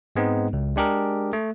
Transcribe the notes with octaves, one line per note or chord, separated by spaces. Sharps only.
G#2 G#3 B3 C4 D#4
C#2
G#3 D4 G4 G#4 A#4
A3